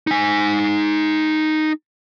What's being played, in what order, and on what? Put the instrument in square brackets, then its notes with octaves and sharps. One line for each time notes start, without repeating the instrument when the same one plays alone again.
[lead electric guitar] D#4 G#5